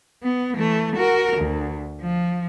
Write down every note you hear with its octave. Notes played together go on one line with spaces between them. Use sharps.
B3
E3 A3
F#4 A#4
D2
F3